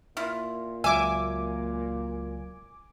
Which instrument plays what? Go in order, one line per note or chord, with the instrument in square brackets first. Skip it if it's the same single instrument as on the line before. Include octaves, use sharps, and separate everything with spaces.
[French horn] A#2 [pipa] E4 F4
[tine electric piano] C#2 F#3 A#3 [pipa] E5 [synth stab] G#5 D6